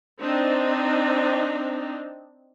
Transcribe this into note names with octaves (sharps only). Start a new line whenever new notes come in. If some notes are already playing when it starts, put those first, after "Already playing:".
C4 D4 D#4